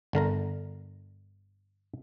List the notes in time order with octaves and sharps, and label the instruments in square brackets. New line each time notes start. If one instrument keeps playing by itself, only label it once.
[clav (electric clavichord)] G1 D3 A#4 A#5